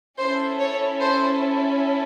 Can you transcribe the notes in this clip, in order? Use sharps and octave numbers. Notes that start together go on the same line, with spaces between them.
C#4 E4 A4 C5
C#5
C5